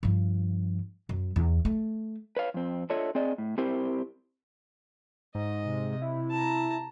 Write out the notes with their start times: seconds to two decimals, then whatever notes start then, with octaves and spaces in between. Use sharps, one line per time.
0.03 G2 F3
1.09 F#2
1.36 E2
1.65 A3
2.37 B4 C#5 F5
2.54 F2 C4
2.90 D4 F4 A4 C#5 D#5 E5
3.15 C4 G#4 D5 D#5
3.38 A2
3.58 C4 E4 G4 A#4 C5
5.35 G#2 D#5
5.65 C3
6.02 E4
6.31 A5 A#5